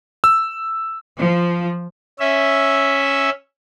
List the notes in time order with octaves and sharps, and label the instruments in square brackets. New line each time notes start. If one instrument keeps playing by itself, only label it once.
[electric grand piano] E6
[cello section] F3
[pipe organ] C#4 E5